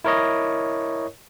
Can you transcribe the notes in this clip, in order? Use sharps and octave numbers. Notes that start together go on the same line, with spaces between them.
E4 A#4 C#5 D#5